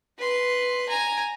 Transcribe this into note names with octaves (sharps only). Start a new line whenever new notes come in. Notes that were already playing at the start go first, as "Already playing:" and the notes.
B4 C6
G#5 A#5